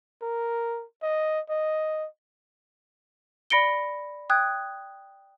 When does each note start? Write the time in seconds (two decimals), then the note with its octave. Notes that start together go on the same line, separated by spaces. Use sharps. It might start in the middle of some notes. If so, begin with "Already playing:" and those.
0.22 A#4
1.02 D#5
1.49 D#5
3.50 D5 B5 A#6 C#7 D7 G7
4.30 G5 D#6 F#6 G#6